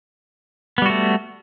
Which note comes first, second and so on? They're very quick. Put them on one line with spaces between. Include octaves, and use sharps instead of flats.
B3 G3 F#4 A3